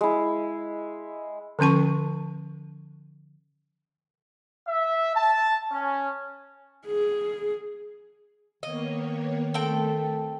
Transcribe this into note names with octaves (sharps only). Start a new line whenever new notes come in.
G#3 E4
D3 F3 C#4 A5 C#6
E5
A5
C#4
G#4
D#3 A#3 B3 C#5 D#5
A3 C4 A4 G5